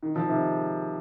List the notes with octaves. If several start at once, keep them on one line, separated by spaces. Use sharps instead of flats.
D#3
F3
C3 D#3